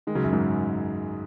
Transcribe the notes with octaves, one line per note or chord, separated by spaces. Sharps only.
D#3 G#3
C#3 F#3
F#2
G#2